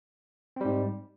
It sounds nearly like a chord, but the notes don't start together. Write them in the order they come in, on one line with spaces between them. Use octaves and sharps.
C4 G3 G#2